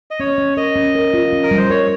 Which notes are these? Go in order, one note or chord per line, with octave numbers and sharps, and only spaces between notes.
D#5
C#4 C#5
C#4
A#4 D#5
C#4
A#4
F4
C#4
A#4
G3
C5
A#4 C#5